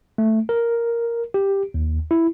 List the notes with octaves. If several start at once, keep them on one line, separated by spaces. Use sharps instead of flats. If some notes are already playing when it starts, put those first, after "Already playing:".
A3
A#4
G4
D#2
E4